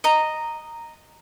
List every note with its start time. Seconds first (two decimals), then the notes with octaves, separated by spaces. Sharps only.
0.04 D#5 A#5